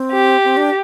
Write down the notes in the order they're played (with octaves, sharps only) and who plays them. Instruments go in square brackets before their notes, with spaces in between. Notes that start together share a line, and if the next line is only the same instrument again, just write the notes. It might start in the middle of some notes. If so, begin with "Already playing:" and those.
Already playing: [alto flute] C4
[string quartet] G4
[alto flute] C4
D4